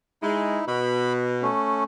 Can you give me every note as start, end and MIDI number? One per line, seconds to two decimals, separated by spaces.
0.23 0.57 56
0.23 0.65 63
0.23 0.65 64
0.68 1.47 47
0.68 1.13 83
1.43 1.84 57
1.43 1.84 61